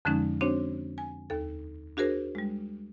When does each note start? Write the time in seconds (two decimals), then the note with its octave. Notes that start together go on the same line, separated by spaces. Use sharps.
0.05 F2 D3 F3 G#3 C#4 D#4
0.41 C4 D4 F#4 C5 C#5
0.98 G#5
1.30 D#2 A4
1.97 D4 F#4 G#4 A#4 C5
2.35 G3 G#3